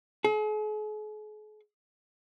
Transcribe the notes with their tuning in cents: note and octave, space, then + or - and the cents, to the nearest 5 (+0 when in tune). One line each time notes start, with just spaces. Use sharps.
G#4 +45